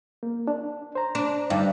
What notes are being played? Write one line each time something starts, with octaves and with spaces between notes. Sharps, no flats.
A#3
D4
C5 A#5
D4
G2 D3 D4 D#4